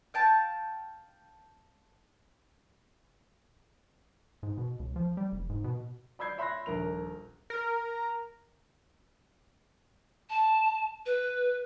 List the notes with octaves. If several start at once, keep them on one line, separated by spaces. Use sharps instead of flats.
F5 G5 A5
G#2
B2
C#2
F3
G3
F1
G#2
B2
D5 B5 E6 G6 G#6 C7
C#5 E5 B5 C6 F#6 A#6
D#1 A#1 A#4 F7
A#4
A5
B4